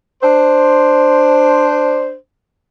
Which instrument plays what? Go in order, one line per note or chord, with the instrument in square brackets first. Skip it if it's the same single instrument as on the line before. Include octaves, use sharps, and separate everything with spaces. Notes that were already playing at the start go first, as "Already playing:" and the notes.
[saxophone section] D4 C5